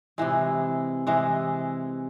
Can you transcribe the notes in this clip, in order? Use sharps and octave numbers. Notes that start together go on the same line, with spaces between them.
C3 E3 G#3
C3 E3 G#3